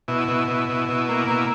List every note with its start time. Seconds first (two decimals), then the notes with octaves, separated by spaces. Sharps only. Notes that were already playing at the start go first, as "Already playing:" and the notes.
0.08 B2 E4
0.28 B2
0.48 B2
0.69 B2
0.89 B2
1.09 A#3
1.28 B2